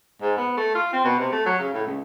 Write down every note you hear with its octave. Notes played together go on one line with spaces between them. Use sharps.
G#2
B3
A3
F4
C4
B2
C3
A3
F#3
C#3
A2
C#2